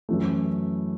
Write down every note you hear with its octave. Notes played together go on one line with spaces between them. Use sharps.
F#2 E3 A3